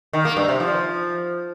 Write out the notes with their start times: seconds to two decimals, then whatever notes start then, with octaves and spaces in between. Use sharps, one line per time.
0.13 D#3
0.25 A#3
0.37 G2
0.48 C3
0.60 F3